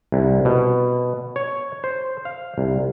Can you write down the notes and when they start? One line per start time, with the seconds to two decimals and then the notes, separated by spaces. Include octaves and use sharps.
0.12 C2
0.45 B2
1.36 C#5
1.84 C5
2.25 F5
2.58 C2